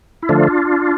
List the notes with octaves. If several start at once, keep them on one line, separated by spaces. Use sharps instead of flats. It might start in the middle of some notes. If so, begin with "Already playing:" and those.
E4
D3 F3 A3 D4 F4